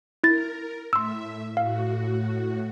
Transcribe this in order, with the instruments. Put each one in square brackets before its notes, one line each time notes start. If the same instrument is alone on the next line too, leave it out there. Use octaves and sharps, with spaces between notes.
[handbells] E4 A6 [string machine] A#4
[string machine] A2 E5 [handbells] C6 E6
[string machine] A2 F#4 [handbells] F5